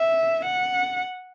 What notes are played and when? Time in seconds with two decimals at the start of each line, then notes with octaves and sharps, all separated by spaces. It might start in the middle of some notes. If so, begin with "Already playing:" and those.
Already playing: E5
0.45 F#5